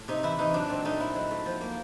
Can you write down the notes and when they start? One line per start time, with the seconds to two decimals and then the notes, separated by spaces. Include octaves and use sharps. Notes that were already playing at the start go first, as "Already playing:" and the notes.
Already playing: A2
0.08 C3 D#4
0.23 E3 E4
0.39 E3 D#4
0.54 F#3 D4
0.69 A#2 C4
0.85 A3 D#4
0.99 F#3 E4
1.15 F#3
1.31 A3
1.46 F3
1.61 A#3